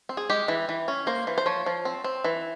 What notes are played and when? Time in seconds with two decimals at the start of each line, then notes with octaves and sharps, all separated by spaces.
0.09 C4
0.17 G#4
0.30 G#3 G4
0.48 E3
0.69 E3
0.88 C#4
1.07 A#3 C5
1.27 E3
1.38 C5
1.46 F3 C#5
1.66 F3
1.85 C4
2.04 C4
2.24 E3